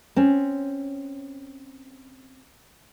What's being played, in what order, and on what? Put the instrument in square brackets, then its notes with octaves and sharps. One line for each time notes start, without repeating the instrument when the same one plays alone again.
[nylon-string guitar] C4 C#4